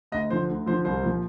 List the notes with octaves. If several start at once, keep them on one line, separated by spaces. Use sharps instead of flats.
D2 D#5
D3 F3 C5
D2
D3 F3 C5
C2 C5
A#2 F3